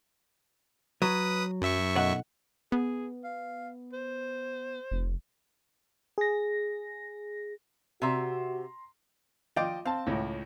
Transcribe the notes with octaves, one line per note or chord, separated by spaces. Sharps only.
F#3 B4 D#6
F#2 E5 C#6
B1 F#5
B3 G#4
F5
C5
F1
G#4 A#6
C3 F#4 E5 A#5 C6
F3 D5 D#5 F5 G5 D6
C4 F5 A5
C#2 A2